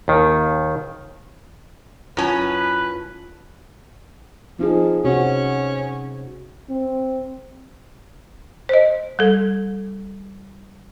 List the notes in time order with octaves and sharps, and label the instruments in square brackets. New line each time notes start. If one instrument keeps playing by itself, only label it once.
[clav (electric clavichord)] D#2 D#3
[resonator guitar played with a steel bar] F#2 C#4 [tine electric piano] E4 F4 A5 [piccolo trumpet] B4
[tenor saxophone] F3 [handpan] C4 D#4 G#4
[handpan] C3 C4 F#4 [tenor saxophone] C#4
[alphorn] C4
[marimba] C5 D#5
G3 A4